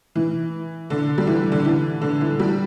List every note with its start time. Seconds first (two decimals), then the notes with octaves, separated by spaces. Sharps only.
0.16 E3
0.90 D3
1.18 G3
1.27 E3
1.52 D3
1.65 E3
2.02 D3
2.21 E3
2.40 G3